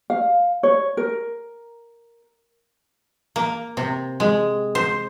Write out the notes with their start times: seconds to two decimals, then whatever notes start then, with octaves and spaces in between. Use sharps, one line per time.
0.10 F5
0.63 C#5
0.97 A#4
3.36 A#3
3.77 C3
4.20 G#3
4.75 C5